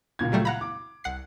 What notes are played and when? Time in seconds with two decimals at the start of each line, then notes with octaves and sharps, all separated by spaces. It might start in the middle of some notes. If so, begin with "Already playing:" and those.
0.19 C#2 A#2 G#6
0.32 F#3 G3 A3
0.45 F5 F#5 A#5 B5
0.61 D6
1.04 C2 F#5 C7